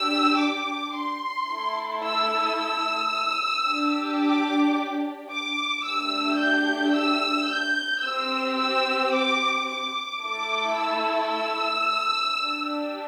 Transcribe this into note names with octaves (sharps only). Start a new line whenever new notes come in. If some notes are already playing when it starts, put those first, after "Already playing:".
Already playing: D4 G4 E6
D6
C6
A3 E4 A4
E6
E6
D4 G4
D6
D6
A3 D4 G4 E6
G6
E6
G6
C4 G4 E6
E6
D6
D6
A3 E4 A4 D6
E6
E6
D4 G4